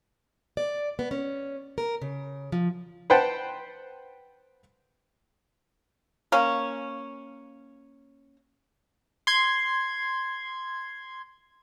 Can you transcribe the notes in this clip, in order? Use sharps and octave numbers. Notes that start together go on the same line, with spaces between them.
D5
B3
C#4
A#4
C#3
F3
B4 C5 F#5 G5 A5
A#3 C#4
C6 G#6